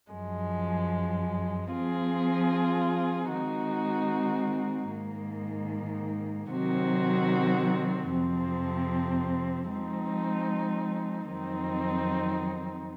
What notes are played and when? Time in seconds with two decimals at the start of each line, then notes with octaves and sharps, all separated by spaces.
0.11 F#2 F3 G#3
1.70 F3 C4 F4 G#4
3.31 D#3 G#3 C4 D#4 F#4
4.90 G#2 D#3 A#3
6.50 C3 D#3 F#3 C4 F#4
8.09 F2 C3 F3 C4
9.70 F3 G#3 C4 D#4
11.30 F2 D#3 F#3 C4 D#4